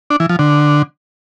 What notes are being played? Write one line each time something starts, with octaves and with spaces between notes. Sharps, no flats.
D4
E3
F3
D3